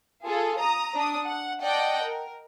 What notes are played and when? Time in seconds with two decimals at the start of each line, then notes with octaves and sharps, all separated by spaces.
0.25 F4 G#4 A4
0.59 A#5 D#6
0.95 D4 D#6
1.26 F#5
1.62 D5 D#5 F#5 G5 A5
2.03 A#4